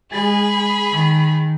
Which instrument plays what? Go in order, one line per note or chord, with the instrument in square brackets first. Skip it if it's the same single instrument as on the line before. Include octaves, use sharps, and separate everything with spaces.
[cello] G#3 [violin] G#4 B5
[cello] D#3